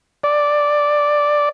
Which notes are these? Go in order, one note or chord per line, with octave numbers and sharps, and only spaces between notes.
D5